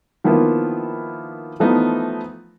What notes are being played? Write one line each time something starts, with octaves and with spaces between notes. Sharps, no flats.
D#3 F3 A#3 B3 E4 F4
E3 F3 A3 B3 D#4